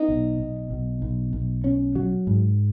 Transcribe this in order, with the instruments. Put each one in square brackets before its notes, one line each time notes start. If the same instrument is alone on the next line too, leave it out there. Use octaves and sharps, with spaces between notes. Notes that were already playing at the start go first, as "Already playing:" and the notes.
Already playing: [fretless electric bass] B3 [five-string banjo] D#4
[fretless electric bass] B1
B1
B1
B1
B1
C#4
F#3
G#2